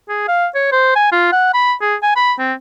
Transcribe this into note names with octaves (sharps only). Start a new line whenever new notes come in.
G#4
F5
C#5
C5
G#5
F4
F#5
B5
G#4
G#5
B5
C4